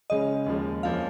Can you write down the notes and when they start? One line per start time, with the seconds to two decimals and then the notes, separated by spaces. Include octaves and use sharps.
0.10 C#2 C#3 G#3 C#4 D#5
0.46 D#2 C#3 F3 G#3
0.83 F2 F3 A#3 C#4 F5